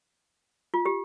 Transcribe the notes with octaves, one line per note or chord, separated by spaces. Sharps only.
F4
G4